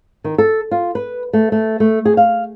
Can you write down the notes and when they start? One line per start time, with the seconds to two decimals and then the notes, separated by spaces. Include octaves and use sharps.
0.24 D#3
0.38 A4
0.71 F4
0.95 B4
1.33 A3
1.52 A3
1.80 A3
2.05 G#4
2.17 F5